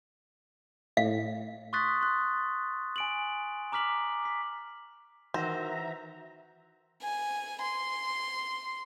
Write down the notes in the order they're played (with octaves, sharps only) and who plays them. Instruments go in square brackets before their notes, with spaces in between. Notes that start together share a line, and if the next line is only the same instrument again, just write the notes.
[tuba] A2 [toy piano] F5
[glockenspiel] C6 C#6 D#6 F#6 A6 B6
C6 F#6
G#5 D7 F#7
A#5 D6 F6 B6 F#7
B6
[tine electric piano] D#3 [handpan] E3 F#4 F#5 [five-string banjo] C5 [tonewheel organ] E5 A#5
[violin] G#5
C6